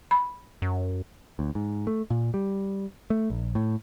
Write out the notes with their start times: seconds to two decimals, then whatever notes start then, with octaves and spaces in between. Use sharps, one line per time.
0.11 B5
0.62 F#2
1.39 D2
1.55 G#2
1.87 A3
2.10 A#2
2.34 G3
3.10 A3
3.30 A#1
3.55 A2